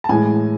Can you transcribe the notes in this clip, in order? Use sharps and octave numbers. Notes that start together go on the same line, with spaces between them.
A5
A2 E3 G#3 G#5